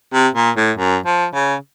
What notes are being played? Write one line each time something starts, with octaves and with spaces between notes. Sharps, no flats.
C3
A#2
A2
F#2
F3
C#3